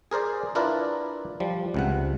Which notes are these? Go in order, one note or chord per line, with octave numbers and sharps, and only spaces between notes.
G#4 A#4 C5 D5
D4 E4 F4 A#4 B4 D5
F3 G3
C#2 C3 F#5